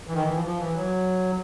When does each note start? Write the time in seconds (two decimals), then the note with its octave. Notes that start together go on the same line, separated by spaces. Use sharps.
0.07 E3
0.14 D#3
0.24 E3
0.35 F3
0.45 F3
0.60 E3
0.76 F#3